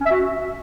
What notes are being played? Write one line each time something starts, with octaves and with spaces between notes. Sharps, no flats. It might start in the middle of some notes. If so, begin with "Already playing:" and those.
C#4
E5
F#4